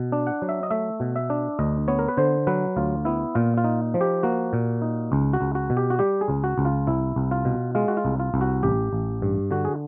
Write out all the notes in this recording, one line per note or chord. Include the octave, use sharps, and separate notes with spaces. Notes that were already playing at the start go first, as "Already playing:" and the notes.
Already playing: B2
D4
F#5
F#3
E5
D#5
A3 E5
B2
E5
D4
D2 D#5
B3 C#5
A#4
B4
D3 C5
F#3 B4
D2 F4
B3 E4
A#2 F4
F4
D#4
F3
G4
A#3 F#4
A#2
D#4
C#2
F#4
C#2
F#4
B2
G4
F#4
G3 G4
G#4
C#2
F#4
C#2
F4
C2 E4
C2
F4
B2
G#3 F4
F#4
F4
C2
F4
C2
F#4
A1 G4
A1
G2
D3 F#4
G#4